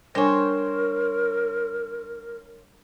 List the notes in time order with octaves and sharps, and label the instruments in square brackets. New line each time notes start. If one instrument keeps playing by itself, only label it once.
[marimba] G3 D4 G#5 [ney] A#4 [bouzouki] C5 C#5